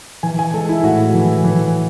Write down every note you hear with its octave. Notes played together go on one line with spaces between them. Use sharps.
E3 G#5
G#5
G#3 A4
E4
A2 F#4
E3
E3